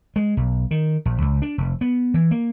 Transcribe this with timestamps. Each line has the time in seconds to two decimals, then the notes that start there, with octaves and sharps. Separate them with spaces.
0.16 G#3
0.37 B1
0.71 D#3
1.05 A#1
1.22 C#2
1.42 D4
1.58 F1
1.81 B3
2.14 E3
2.31 A#3